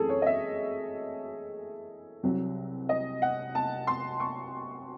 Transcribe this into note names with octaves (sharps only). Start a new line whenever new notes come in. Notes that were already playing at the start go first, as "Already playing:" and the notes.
Already playing: F#2 E3 A3 C4 G#4 A4
C#5
D#5
E5
C2 C3 F#3
D#5
F#5
A5
C6
C#6